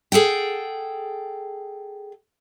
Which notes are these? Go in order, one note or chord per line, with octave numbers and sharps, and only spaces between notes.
G#4 A4 F#5 G5